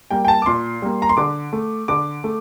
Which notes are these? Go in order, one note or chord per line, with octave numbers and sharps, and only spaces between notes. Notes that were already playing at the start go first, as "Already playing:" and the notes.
G3 A#3 G5
G5
A5
D6
A#2 C6
G3 A#3
A#5
C6
D3 D6
A3
D3 D6
A3